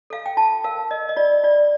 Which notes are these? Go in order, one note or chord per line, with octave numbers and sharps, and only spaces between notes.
A4 F5
G5
F4 A5
A#4 F5
A#4 D#5
D#5
F4 D5
F4 D5